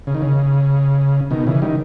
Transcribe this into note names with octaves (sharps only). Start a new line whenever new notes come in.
C#3
D#3
C#3
B2 D#3
C#3 E3
D#3 G3